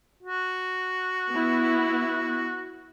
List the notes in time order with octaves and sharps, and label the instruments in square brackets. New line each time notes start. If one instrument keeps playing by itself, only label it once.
[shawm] F#4
[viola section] B3 E4